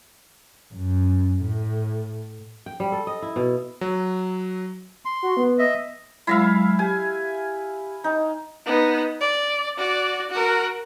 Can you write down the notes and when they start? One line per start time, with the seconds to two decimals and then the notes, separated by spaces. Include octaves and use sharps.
0.73 F#2
1.42 A2
2.66 G5
2.80 G3
2.92 A4
3.07 D#5
3.22 E4
3.36 B2
3.81 F#3
5.05 C6
5.23 F#4
5.37 B3
5.59 D#5 E5
6.27 F#3 G#3 E4 E5 F5 B5
6.79 G4 G#5
8.04 D#4
8.66 B3 D#4
9.21 D5
9.78 F#4 D5
10.31 F#4 A#4